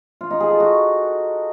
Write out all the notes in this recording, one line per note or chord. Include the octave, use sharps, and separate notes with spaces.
F4
D#4
G#4
A4
F#4